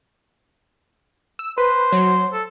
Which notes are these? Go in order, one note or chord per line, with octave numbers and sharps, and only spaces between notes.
E6
B4 C5
F#3
A4